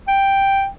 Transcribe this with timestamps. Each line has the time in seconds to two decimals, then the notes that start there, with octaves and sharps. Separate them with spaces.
0.08 G5